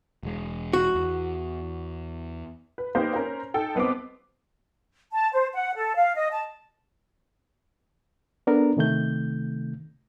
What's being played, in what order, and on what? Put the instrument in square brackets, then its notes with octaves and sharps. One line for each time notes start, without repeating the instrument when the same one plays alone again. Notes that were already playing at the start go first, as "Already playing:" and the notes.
[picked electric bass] E1 G#3
[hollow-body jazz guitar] F#4
[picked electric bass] E2
[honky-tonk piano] B4
A#3 D#4 G4 B4 C5
C#4 A#4 C5
D#4 A4 G5
B1 B3 C4 D6
[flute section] A5
C5
F#5
A4
F5
D#5
A5
[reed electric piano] B3 D4 A4 A#4
C3 D#3 A3 G6